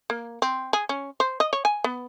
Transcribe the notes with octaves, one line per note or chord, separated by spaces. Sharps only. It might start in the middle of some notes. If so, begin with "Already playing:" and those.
A#3
C4
G#4
C#4
C5
D#5
C#5
G#5
B3